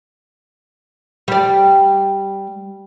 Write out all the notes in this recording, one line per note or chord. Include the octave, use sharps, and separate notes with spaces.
G3 D5